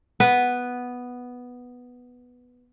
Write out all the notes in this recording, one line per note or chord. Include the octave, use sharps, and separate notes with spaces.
B3 B4